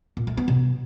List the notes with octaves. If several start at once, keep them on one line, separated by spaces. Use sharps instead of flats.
A#2
A3
B3
B2